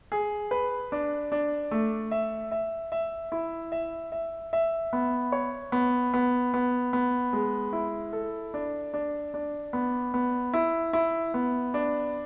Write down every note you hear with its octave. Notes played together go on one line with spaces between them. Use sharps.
G#4
B4
D4
D4
A3
E5
E5
E5
E4
E5
E5
E5
B3
C#5
B3
B3
B3
B3
G#3
E4
A4
D4
D4
D4
B3
B3
E4
E4
B3
D4